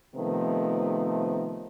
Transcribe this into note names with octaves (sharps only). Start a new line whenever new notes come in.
C3 D#3 F3 A3 B3